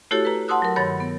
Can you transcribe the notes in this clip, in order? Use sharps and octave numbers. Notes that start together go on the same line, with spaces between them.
A3 E4 F#4 G4 A4 C#5
B4 A#5
F#5 A5 C6 D#6 E6 F#6
F#3 A#4
G2 D#3 C#5 B5 A6
B3